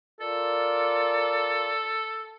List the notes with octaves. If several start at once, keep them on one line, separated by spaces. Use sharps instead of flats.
F4 A4 A#4 D5